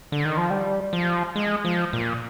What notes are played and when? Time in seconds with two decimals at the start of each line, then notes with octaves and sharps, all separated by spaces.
0.12 D3
0.25 D#3
0.37 F3
0.50 G3
0.93 F3
1.36 G#3
1.65 F3
1.93 A#2